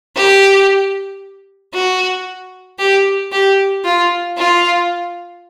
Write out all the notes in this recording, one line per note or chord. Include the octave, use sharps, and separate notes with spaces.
G4
F#4
G4
G4
F4
F4